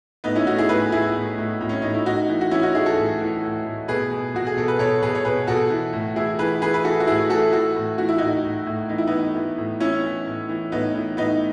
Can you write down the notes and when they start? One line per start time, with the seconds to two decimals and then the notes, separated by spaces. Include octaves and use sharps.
0.24 A2 B3 D#4
0.35 C#4 E4
0.46 A2 D#4 F#4
0.58 E4 G#4
0.69 A2 G#4 B4
0.92 A2 E4 G#4
1.15 A2
1.38 A2
1.61 A2
1.69 C#4
1.82 A2 D#4
1.94 E4
2.06 A2 D#4 F#4
2.29 E3
2.41 F#4
2.51 E3 C#4 E4
2.63 D#4 F#4
2.75 E3 E4 G#4
2.86 F#4 A4
2.98 A2
3.21 E3
3.43 A2
3.66 A2
3.88 B2 G#4 B4
4.11 B2
4.35 B2 F#4
4.47 G#4
4.56 B2 A4
4.68 B4
4.79 B2 A4 C#5
5.02 B2 G#4 B4
5.15 C#5
5.25 B2 G#4 B4
5.47 B2 F#4 A4
5.70 E3
5.93 A2
6.16 E3 E4 G#4
6.39 E3 G#4 B4
6.62 E3 G#4 B4
6.74 B4
6.84 E3 F#4 A4
7.00 F#4
7.07 A2 E4 G#4
7.30 E3 F#4 A4
7.52 E3 F#4 A4
7.76 A2
7.98 E3 F#4
8.09 E4
8.18 A2 D#4 F#4
8.44 A2
8.67 A2
8.89 E3 D#4
8.98 E4
9.07 E3 B3 D#4
9.35 E3
9.58 A2
9.80 E3 C#4 E4
10.04 E3
10.26 A2
10.49 E3
10.72 A2 B3 D#4
10.95 E3
11.17 A2 B3 D#4